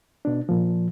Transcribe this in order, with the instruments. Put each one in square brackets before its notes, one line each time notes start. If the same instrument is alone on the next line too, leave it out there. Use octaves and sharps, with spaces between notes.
[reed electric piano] B2 D4
A#2 F3